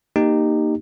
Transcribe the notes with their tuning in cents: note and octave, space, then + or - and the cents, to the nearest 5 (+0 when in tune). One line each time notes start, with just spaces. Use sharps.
A#3 +0 D#4 -15 G4 +0